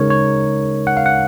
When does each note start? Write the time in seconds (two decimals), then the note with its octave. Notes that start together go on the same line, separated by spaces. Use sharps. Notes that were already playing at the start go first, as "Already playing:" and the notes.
Already playing: C#3 G#3 D#4 A#4 C#5
0.10 C#5
0.87 F#5
0.97 F5
1.06 F#5